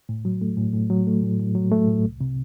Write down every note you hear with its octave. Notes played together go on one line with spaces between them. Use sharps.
A2
F#3
A3
A2
A2
F#3
A3
A2
A2
F#3
A3
A2
C2
C3